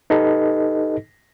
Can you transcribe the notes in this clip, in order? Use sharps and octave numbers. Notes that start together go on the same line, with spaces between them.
D#4 G4 A4 B4 D#5